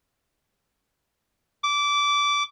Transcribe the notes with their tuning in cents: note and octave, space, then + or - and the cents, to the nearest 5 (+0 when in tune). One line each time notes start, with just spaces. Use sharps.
D6 -20